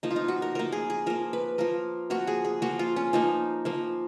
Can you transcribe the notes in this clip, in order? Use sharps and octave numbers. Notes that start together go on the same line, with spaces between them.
F3 A#3 D#4
F4
D#4
F#4
A#4
F3 A#3 A#4
G#4
G#4
F3 A#3 A#4
B4
F3 A#3 A#4
F3 A#3 F#4
G#4
G#4
F3 A#3 F#4
F4
C#4
F3 A#3 D#4
F3 A#3